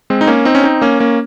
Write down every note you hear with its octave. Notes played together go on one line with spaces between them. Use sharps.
G#3 C4
D#4
A#3 C#4
C4 D#4
C#4
C4 D#4
A#3 C#4
A#3 C#4